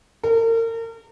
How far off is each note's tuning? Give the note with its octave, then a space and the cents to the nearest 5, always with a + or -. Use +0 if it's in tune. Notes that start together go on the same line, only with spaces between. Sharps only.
A#4 -35